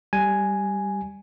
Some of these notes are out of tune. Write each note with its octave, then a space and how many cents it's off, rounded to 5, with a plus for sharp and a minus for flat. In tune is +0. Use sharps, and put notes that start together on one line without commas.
G3 +0 G#5 +0